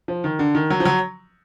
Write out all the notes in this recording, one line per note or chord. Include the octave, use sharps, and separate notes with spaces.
F3
D#3
D3
D#3
F#3
F3
F#3